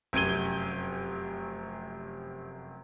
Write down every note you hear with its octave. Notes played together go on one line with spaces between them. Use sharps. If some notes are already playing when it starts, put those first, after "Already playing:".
F1 F#2 G#6 D#7 G7